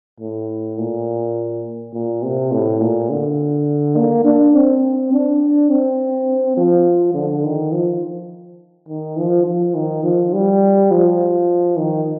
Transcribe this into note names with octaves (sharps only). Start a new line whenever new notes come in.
A2
A#2
A#2
C3
A2
A#2
D3
A#3
D4
C4
D4
C4
F3
D3
D#3
F3
D#3
F3
F3
D#3
F3
G3
F3
D#3